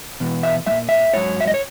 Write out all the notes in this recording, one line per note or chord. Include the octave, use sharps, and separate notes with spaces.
E2 B2
E5
A#2 G#3 E5
E5
G#2 F#3 C#5
E5
D#5
C#5